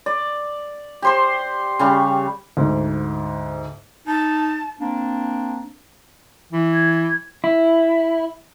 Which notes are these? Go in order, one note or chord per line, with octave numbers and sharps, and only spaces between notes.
D5
G4 C5 C6
C#3 G3 C#6
D2 G#2
D#4 A5
A#3 C4 D4
E3
G#6
E4